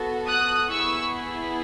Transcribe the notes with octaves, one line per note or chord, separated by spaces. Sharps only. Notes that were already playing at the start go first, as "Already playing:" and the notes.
Already playing: B3 F#4 A4
D#6 F#6
B3 E4 G#4 C#6 E6